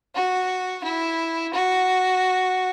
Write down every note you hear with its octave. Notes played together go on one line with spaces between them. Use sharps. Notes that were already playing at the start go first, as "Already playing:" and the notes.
F#4
E4
F#4